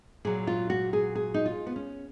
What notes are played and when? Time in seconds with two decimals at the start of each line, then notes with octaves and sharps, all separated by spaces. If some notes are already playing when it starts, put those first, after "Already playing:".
0.25 A#2 F#3 G#4
0.47 F4
0.70 F#4
0.93 G#4
1.15 G#4
1.34 D#4
1.46 F4
1.66 B3
1.76 C#4